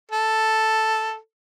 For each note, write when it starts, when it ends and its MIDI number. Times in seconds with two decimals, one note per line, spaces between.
0.12 1.16 69